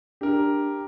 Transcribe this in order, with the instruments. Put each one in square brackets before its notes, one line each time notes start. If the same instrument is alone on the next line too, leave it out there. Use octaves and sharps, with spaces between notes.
[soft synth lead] D4 [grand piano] G4 A#4